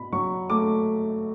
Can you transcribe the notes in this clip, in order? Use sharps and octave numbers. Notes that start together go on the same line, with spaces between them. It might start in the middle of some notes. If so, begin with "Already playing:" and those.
Already playing: B2 B5
F#3 C#6
A3 D6